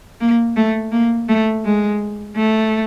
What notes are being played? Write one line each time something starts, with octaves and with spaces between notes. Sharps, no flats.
A#3
A3
A#3
A3
G#3
A3